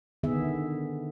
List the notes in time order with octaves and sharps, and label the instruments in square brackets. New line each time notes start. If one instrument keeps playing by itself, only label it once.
[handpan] D3 D#3 B3 G#4 E5